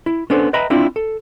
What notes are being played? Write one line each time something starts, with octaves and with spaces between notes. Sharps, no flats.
E4
B3 C#4 D4 A4 C5
B4 D#5 E5 G5 A#5 B5
C4 D4 E4 F4
A4